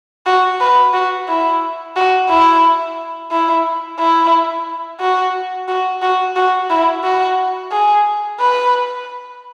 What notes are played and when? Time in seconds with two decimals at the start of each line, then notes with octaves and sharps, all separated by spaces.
0.26 F#4
0.60 B4
0.93 F#4
1.28 E4
1.96 F#4
2.29 E4
3.31 E4
3.99 E4
5.00 F#4
5.68 F#4
6.02 F#4
6.36 F#4
6.70 E4
7.04 F#4
7.71 G#4
8.39 B4